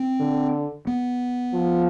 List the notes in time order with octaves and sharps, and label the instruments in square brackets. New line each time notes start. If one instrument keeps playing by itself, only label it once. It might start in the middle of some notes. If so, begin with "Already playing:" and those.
Already playing: [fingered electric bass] C4
[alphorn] D3
[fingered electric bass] B3
[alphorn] F3